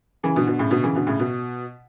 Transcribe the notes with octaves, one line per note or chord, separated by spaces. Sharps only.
C#3 E3
B2 D3
B2 D3
A2 C#3
B2 D3
C#3 E3
B2 D3
A2 C#3
B2